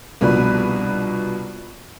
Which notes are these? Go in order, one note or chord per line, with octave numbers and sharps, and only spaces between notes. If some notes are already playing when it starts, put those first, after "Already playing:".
C2 B2 F3 D4 B4